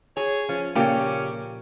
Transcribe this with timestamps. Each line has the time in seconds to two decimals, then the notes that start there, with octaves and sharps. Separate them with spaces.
0.17 G#4 C#5
0.49 F3 C#4
0.75 A#2 C#3 A#3 C#4 G4 A4